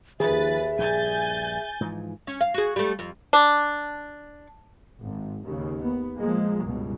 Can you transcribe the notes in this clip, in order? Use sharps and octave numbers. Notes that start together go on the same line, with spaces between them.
D#2 D#3 F3 G#4 B4 E5 A6
A#1 G2 G#5 G6 A6
G#2 E3 F3
C#4
F5
F#4 G#4
G3 A3
F2
D4
G#1
D#2 G#2 C#3
B3
A#2 F3 G#3 A#3
C#2 G2 B2